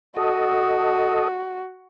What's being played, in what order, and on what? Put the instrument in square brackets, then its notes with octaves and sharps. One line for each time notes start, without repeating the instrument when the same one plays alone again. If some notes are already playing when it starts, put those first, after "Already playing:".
[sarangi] F#4 [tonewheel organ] A4 D#5